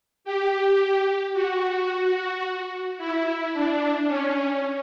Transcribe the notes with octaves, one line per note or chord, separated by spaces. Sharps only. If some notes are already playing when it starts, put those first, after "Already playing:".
G4
F#4
E4
D4
C#4